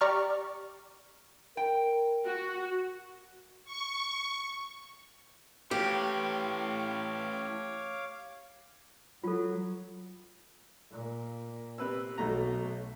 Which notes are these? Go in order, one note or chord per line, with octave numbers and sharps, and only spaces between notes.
G4 D5 A#5 C#6 F6
A#4 G5
F#4
C#6
A2 E3 G4 C#5 F5 D6
F#3 F4 A4
A#2
C3 B4 E6
B1 B2 A3 A#5